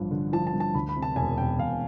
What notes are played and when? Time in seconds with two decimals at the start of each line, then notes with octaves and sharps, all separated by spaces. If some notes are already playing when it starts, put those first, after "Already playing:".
Already playing: A1 G2 F3
0.11 D3
0.33 F3 A5
0.47 A5
0.54 G2
0.60 A5
0.74 D2 B5
0.89 B5
0.96 C3
1.02 A5
1.16 E1 G#5
1.38 E1 G5
1.59 E1 F5